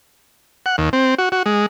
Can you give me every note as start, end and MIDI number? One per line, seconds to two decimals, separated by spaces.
0.66 0.76 78
0.78 0.89 39
0.93 1.15 60
1.18 1.29 66
1.32 1.43 66
1.46 1.66 56